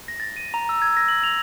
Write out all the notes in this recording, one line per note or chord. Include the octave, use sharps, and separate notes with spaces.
A#6
A6
D#7
A#5
E6
G#6
A#6
F#7
F7